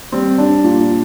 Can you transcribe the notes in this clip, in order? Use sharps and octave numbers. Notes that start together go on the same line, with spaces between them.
G3 C4
G3 D4
A#2